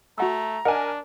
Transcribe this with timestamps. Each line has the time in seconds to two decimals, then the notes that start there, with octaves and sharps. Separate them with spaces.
0.18 A3 F#4 F#5 A#5 E6
0.65 D4 A#4 D#5 F#5 G#5